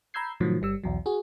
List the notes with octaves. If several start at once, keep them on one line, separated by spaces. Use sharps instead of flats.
A#5 B5 E6 G6 G#6 C7
A2 C3 D#3 F3 F#3
G1 G3 E6
B1 E2 F#3
F#4 G#4